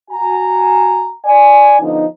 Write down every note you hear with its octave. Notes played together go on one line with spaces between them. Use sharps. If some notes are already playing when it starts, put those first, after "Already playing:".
F#4 G#5 A#5
D5 G#5
D3 F3 B3 D#4